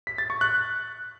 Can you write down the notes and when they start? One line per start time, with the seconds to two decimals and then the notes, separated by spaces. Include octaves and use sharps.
0.07 B6
0.18 A6
0.30 C#6
0.41 F#6